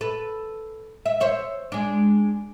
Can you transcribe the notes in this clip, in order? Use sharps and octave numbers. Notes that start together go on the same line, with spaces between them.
A4 B4
E5
C5 C#5 E5
G#3 D4